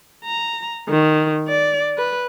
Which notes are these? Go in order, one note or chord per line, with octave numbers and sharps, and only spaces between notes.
A#5
D#3
D5
B4